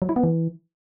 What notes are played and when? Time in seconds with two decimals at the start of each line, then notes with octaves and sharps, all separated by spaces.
0.02 F#3
0.09 E4
0.16 B3
0.23 E3